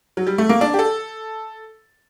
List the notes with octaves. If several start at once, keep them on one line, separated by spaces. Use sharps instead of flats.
F#3
G3
A3
A#3
D4
G4
A4